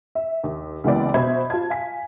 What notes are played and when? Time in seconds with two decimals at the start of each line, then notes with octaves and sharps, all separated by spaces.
0.15 E5
0.44 D#2
0.84 C#2 E3 G#3 A#3 B3 D5
1.14 B2 C5 E5 B5 G#6
1.50 F4 A5 G#6
1.70 F5 G#5 B6